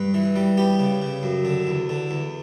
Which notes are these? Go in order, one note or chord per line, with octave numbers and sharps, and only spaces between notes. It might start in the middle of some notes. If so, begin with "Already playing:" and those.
Already playing: G2 B4
E3
G3
B3 G4
C#3
C#3
F#2
D3
E2
D3
E2